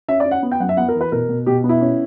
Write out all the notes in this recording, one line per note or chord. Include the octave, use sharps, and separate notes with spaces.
C#4 E5
D5
C#4
F#5
B3
G5
F#2 F#5
E5
B3 F#5
A#4
E3
B4
B2 A#4
B2
B2 G4
B3
E4
C#4